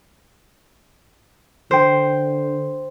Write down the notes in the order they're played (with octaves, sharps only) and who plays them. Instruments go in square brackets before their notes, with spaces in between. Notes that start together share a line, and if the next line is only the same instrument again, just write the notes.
[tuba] D3 [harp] C5 G5